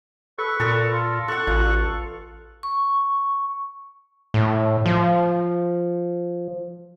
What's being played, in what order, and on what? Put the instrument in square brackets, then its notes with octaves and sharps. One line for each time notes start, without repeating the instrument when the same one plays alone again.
[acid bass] A4 [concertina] B4 C#6
[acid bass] A#2 [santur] A4 A#4
[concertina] F4
[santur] A4 F#5 [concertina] C#6 F#6
[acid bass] A1 [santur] F4
[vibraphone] C#6
[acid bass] A2
F3